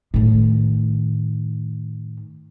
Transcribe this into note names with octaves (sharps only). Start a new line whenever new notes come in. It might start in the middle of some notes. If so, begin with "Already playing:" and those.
A2 D#3